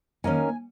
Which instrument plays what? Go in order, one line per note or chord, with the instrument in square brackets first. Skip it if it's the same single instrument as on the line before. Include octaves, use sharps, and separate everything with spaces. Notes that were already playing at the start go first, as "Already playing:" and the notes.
[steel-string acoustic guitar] D#3 A#3 C#4 G#5